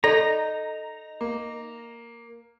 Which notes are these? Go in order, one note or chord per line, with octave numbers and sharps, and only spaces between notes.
D#4 A4 D5 A#5
A#3